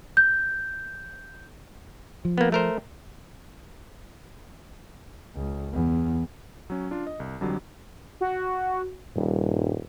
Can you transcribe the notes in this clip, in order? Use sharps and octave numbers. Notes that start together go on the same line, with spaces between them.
G6
F3
A#3 B3
A3 A#4 C5
C#2
E2
F#3 C#4
D4 F4
D#5
C2
F2 D3 F#3 G3
F#4
D#1 G2